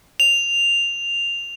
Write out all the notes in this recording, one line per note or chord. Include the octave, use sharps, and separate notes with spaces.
F7